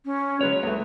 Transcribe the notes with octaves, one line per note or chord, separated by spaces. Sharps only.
C#4
F#3 G#3 C#4 B4 C#5
C#2 A3